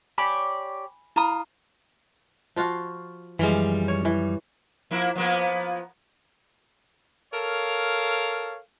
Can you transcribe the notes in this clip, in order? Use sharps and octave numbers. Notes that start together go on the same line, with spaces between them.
G4 C#5 D5 G#5 B5
E4 F4 A#5 B5 D#6
F3 F4 F#4
F#2 E3 F3 G3 G#3
C#5
E3
F3 A#3 E4
F3 A#3 B3
A4 A#4 C#5 F5